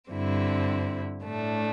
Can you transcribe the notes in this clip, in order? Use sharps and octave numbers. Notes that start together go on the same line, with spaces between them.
G2 D3 C4 E4
A2 A3 D4